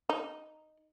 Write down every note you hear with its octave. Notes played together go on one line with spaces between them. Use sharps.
D#4